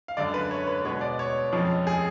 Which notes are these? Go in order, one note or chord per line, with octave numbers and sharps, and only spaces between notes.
F5
F#2 D3 G#3 D5
B4
C#5
B4
B2 G#3 B3 C#5
D5
C#5
F2 F3 G#3 C#4
G#4